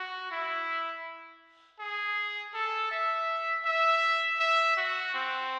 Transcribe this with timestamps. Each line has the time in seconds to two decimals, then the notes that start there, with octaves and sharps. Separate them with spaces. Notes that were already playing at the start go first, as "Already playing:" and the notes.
Already playing: F#4
0.31 E4
1.80 G#4
2.54 A4
2.91 E5
3.66 E5
4.40 E5
4.77 F#4
5.14 C4